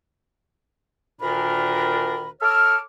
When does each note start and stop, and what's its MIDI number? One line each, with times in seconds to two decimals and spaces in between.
1.21 2.29 38
1.21 2.29 46
1.21 2.29 51
1.21 2.29 62
1.21 2.29 70
1.21 2.29 83
2.42 2.78 69
2.42 2.78 73
2.42 2.78 86
2.42 2.78 88
2.42 2.78 89